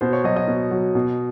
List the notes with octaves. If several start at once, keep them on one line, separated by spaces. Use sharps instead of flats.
B2 C5
C#5
F#3 D#5
D#5
B2
F#3
B2